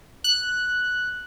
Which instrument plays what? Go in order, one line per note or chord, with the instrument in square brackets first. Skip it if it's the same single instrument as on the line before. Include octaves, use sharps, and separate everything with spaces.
[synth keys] F#6